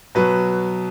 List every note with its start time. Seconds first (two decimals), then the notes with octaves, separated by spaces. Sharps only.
0.15 B2 F#3 B4